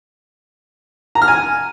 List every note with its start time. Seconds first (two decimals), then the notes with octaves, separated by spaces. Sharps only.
1.15 A#5
1.22 F6
1.28 G#5